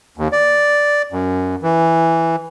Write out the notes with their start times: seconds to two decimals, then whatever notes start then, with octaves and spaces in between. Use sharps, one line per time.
0.18 D#2
0.32 D5
1.12 F#2
1.62 E3